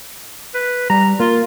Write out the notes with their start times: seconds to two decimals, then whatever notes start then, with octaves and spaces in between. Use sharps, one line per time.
0.55 B4
0.90 G3 A#5
1.20 A#3 F4